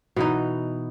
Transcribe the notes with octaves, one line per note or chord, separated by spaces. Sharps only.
B2 E3 D#4